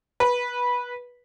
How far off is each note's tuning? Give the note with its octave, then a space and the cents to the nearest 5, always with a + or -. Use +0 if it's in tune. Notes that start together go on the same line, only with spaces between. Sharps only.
B4 -15